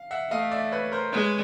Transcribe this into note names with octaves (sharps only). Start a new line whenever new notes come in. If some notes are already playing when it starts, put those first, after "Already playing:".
Already playing: F5
E5 F#5
A3 D#5 F5
D5 E5
B4 C#5
A#4 C5
G#3 B4 C#5